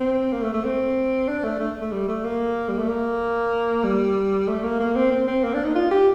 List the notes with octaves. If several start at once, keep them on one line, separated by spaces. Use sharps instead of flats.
C4
A#3
A3
A3
C4
D4
A3
A3
A3
G3
A3
A#3
G3
A3
A#3
G3
A3
A#3
A#3
C4
C4
C4
A#3
D4
D#4
F4
G4